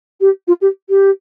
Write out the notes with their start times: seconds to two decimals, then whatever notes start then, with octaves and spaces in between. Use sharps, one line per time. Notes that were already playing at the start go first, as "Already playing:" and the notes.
0.20 G4
0.47 F4
0.61 G4
0.89 G4